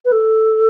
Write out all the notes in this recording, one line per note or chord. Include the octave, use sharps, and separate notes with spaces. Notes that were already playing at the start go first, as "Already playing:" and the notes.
B4
A4